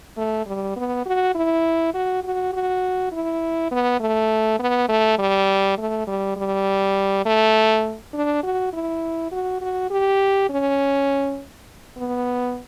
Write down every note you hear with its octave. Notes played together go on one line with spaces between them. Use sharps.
A3
G3
B3
F#4
E4
F#4
F#4
F#4
E4
B3
A3
B3
A3
G3
A3
G3
G3
A3
D4
F#4
E4
F#4
F#4
G4
C#4
B3